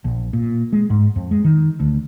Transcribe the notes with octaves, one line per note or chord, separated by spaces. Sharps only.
A#1
A#2
G#3
G#2
F2
G#3
D#3
D2